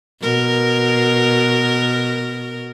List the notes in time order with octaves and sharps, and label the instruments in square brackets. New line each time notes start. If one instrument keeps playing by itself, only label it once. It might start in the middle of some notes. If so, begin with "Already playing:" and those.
[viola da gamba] B2 A#4